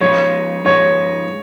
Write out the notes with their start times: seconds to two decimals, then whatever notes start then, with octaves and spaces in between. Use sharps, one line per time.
0.01 F3 G#3 D#4 C#5
0.65 F3 G#3 D#4 C#5